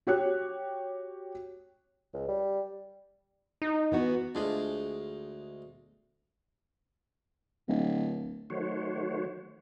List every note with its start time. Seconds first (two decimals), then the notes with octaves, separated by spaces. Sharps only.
0.07 F#4 G4 C#5 F#6
2.13 C#2
2.28 G3
3.62 D#4
3.92 E3 B3 F#4
4.35 D2 G#3 D4 F4 G#4
7.68 D1
8.50 D#3 F#3 A3 F#4 C5 C#5